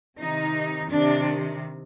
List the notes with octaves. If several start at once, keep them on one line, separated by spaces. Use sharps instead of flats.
C3 D#3 D#4
C3 D#3 D4